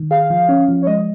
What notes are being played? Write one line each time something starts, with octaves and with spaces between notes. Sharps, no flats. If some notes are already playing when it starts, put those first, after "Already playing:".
Already playing: D#3
G#4 F5
F3
C#4
F3
C#5
G#3 D#5